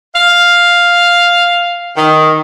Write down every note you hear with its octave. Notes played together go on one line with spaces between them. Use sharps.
F5
D#3